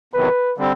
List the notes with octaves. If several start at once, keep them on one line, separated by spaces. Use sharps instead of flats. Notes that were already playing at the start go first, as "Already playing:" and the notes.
E2 C3 D#3 F#3 B4
D3 G3 C4